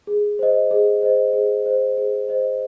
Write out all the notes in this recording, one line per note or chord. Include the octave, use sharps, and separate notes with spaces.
G#4
C5 D#5
G#4
C5 D#5
G#4
C5 D#5
G#4
C5 D#5